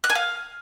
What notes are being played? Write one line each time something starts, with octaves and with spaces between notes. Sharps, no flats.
F#6
G#5
F5